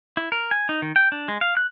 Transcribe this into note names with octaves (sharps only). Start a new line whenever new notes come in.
E4
A#4
G#5
D#4
D#3
G5
D4
G#3
F5
F#6